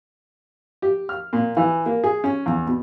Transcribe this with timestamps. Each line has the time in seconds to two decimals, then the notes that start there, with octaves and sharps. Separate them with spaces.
0.82 G4
1.09 F6
1.33 A#2
1.57 E3
1.86 A#3
2.04 G#4
2.24 C#4
2.46 E2
2.67 B2